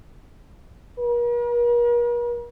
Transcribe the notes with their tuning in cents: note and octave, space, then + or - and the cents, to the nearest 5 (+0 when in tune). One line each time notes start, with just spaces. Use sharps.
A#4 +45